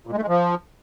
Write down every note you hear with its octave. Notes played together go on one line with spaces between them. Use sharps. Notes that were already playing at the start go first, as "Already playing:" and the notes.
A#2
G#3
A3
G#3
F3